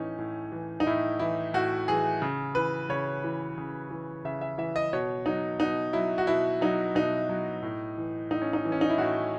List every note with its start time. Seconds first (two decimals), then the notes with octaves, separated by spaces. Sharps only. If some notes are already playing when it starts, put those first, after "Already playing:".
Already playing: A2 E3 C#4 D#4
0.18 A2
0.52 E3
0.80 D#4
0.87 A2 E4
1.19 E3 E4
1.54 A2 F#4
1.88 E3 G#4
2.22 C#3
2.55 E3 B4
2.89 C#3 C#5
3.24 E3
3.58 C#3
3.90 E3
4.25 C#3 E5
4.41 E5
4.58 E3 E5
4.76 D#5
4.93 B2 C#5
5.26 F#3 D#4
5.60 B2 D#4
5.93 F#3 E4
6.18 F#4
6.27 B2 E4
6.61 F#3 D#4
6.95 B2 D#4
7.29 F#3
7.62 A2
7.97 E3
8.31 A2 D#4
8.42 C#4
8.53 D#4
8.65 E3
8.72 C#4
8.81 D#4
8.90 E4
8.98 A2 F#4